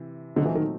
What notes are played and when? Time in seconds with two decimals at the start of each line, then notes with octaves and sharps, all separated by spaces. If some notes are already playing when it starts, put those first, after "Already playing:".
Already playing: C3 E3
0.36 A#2 D3 F#3 A3 C4 D#4
0.45 E3
0.55 D#3